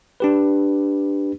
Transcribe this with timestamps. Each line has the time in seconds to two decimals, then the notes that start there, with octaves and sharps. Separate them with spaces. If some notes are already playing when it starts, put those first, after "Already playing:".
0.20 D4 G4 B4